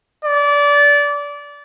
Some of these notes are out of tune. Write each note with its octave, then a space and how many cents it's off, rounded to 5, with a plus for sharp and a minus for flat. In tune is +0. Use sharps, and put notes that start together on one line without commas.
D5 -25